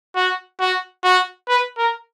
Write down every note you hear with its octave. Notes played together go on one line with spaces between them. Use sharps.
F#4
F#4
F#4
B4
A#4